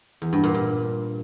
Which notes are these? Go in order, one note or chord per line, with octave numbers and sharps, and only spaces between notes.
E2
G2
A#2
G2